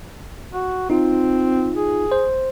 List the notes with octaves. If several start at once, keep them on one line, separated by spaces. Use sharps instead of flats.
F#4
C4 D#4 F4
G#4
C5